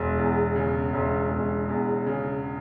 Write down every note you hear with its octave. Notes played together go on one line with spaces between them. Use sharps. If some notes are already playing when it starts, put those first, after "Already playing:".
Already playing: E1
E2
C#3
E1
E1
E2
C#3